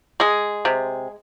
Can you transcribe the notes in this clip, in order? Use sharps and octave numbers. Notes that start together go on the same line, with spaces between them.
G#3 G#4
C3